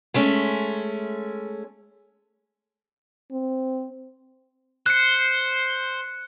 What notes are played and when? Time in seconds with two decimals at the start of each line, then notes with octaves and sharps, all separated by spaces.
0.14 G#3 A3 C#4
3.32 C4
4.86 C5 F#6 C#7